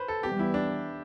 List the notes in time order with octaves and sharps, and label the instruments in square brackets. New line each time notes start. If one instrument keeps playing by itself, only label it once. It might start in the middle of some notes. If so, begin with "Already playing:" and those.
Already playing: [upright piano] B4 C5
A4
[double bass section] E3 G3 B3 [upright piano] G4
[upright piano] E4
D4